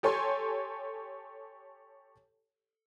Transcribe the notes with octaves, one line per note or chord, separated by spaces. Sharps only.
G4 A4 C#5 G#5 C6